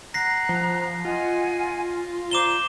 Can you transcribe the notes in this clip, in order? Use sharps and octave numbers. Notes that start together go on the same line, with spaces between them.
F#5 A#5 F#6 A#6 C7
F3
F4 D#5 F#5 G#5
C5 D5 A#5 D6 E7 G7